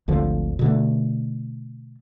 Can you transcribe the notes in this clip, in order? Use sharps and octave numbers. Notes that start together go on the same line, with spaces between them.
G#1 D2 D3 F3
B2 D3 A3